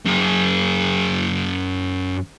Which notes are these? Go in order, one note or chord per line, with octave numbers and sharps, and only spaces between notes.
F#2 G#4